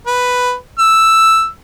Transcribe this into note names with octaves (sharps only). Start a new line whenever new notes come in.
B4
E6